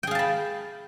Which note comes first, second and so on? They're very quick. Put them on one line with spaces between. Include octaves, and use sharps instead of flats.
G5 G#4 F5 A5 B5